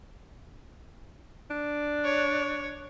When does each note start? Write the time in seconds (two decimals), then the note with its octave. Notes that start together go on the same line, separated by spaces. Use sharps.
1.50 D4
2.05 C#5